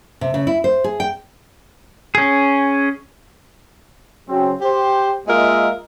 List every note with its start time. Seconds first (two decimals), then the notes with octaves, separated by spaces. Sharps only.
0.21 C3
0.34 C#3
0.47 E4
0.64 C5
0.84 G#4
1.00 G5
2.15 C#4 G#4
4.28 C#3 F#3 C4
4.61 G4 C5
5.27 G#3 A#3 F4 A#4 D#5 E5